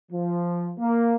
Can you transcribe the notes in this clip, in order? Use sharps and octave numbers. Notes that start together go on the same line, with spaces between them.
F3
A#3